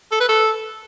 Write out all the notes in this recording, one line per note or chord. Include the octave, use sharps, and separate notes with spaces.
A4
B4
A4